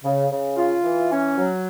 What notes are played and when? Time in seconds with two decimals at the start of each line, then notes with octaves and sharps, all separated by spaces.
0.03 C#3
0.30 C#3
0.57 F4
0.84 E3
1.10 C#4
1.37 F#3